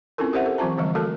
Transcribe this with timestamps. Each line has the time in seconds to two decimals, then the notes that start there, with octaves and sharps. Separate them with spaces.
0.18 C4 C#4 E4 F4 A4 A#4
0.33 G4 A#4 C5 E5 F#5
0.46 A4
0.58 E3 F#3 C4 F4 A5 A#5
0.77 D3 E3 F3 G3 G#3 F5
0.95 A3 F#4 A4 A#4 A5